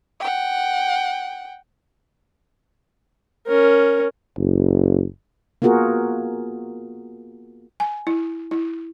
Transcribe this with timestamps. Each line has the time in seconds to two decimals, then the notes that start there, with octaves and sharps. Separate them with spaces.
0.21 F#5 G5
3.47 C#4 A#4
4.38 F#1
5.62 A#3 B3 F4 F#4 G#4 A#4
7.80 G#5
8.07 E4
8.51 E4